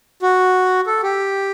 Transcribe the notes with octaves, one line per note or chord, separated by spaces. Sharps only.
F#4
A4
G4